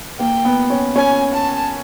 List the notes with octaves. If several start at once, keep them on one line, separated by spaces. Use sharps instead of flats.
A#3 G5
B3
C#4
C#4 G#5
A5